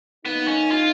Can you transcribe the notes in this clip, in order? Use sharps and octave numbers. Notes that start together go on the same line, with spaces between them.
F#2 D#3 A#3 B3 D#4
C#4
F4